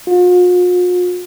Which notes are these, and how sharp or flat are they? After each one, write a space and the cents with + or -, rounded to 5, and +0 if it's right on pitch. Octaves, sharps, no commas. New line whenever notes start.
F4 +45